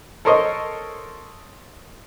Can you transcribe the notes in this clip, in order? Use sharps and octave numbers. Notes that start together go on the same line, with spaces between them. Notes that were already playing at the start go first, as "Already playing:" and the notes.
A4 A#4 C5 C#5 D#5